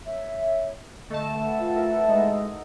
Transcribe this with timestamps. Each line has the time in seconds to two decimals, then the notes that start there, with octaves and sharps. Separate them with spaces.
0.04 C#5 E5
1.10 D3 A3 D#5 A5
1.34 A4 B4 F#5
1.60 F4
1.75 E4 A#4 E5
2.09 G#3 D#4 F#4 D#5